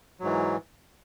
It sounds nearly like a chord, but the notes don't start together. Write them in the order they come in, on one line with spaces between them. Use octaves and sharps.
F#3 G#2 E3